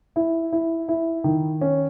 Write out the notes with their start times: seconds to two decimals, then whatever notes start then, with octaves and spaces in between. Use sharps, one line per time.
0.16 E4
0.52 E4
0.88 E4
1.24 D#3
1.61 C#4